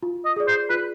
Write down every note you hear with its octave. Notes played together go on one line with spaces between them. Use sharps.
F4
D#5
G#4 D5
C5
F4 B4